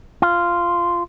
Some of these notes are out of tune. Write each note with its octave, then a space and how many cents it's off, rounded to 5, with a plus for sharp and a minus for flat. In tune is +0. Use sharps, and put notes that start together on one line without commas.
F4 -10